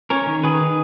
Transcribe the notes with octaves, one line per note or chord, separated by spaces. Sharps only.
C#4 A#4 C#5
D#3
D#3 G#4 B4
D#3